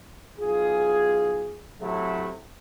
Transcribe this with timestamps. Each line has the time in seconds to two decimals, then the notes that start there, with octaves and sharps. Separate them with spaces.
0.40 B1 F4 G#4
1.80 A2 C3 F#3 A3 E4